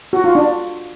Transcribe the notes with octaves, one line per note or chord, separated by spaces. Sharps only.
F#4
F4
D4